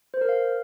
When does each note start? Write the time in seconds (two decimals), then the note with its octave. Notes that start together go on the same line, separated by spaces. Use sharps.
0.14 C5
0.21 A#4
0.29 F5